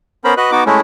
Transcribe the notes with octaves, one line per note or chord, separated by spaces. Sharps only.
B3 C#4 A#4 C5 B5
F#4 B4 D#5 F#6
B3 D#4 F#4 D6
G#3 A3 C#4 E4